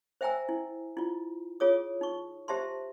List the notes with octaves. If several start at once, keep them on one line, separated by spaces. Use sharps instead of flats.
C5 E5 G5 G#5 A#5 E6
E4
E4 F4
F4 G#4 C#5 D#6
D#4 C#6
G4 C5 E5 A5 A#5 C6